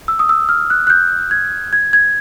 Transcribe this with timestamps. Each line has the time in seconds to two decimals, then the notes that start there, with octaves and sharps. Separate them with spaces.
0.08 E6
0.19 D#6
0.29 E6
0.49 F6
0.70 F#6
0.87 F#6
0.90 G6
1.31 G#6
1.73 G#6
1.93 G#6